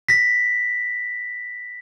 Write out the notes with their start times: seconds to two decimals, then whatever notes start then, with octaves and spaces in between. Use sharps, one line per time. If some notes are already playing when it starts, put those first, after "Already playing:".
0.09 A#6 B6